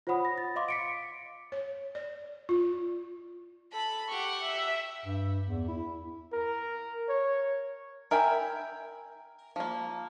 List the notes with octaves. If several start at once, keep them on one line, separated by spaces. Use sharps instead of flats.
F4 C5 C#5 F#5 B5 D#6
A#6
A6
D#5 F5 C6 D6
B6 C#7 D7
C#5
D5
F4
A4 B5
G4 F#5 C#6
E5
G2
E2
E4
A#4
C#5
A#4 E5 G5 G#5 B5
F3 A#3